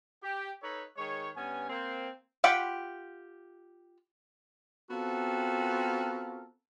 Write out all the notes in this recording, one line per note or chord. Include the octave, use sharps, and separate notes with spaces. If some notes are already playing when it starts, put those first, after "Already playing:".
G4
D#4 A4 B4 C#5
D#3 G#3 C#5
G2 B3 C#4 G#5
A#3 C4
F4 G4 F#5 G5 B5
B3 C4 F4 F#4 A4 A#4